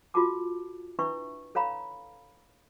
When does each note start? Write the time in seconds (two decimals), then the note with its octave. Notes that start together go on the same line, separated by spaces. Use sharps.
0.14 F4 F#4 G#4 A4 A5 D6
0.99 D4 E4 B4 E5 C#6
1.55 A4 C#5 F5 A#5 B5